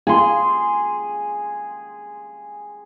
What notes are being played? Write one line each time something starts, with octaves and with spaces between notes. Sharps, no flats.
G#4 C6